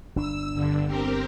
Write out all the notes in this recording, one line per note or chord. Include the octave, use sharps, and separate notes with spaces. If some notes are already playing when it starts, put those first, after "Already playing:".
G1 D4 E6
G2 D3
C4 G4 A#4